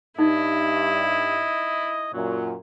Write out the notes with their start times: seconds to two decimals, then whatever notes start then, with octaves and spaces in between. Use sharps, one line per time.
0.19 G2 D#4 E4 D#5
2.13 F#2 A#2 F#3